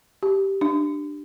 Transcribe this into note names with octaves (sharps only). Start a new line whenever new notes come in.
G4
D4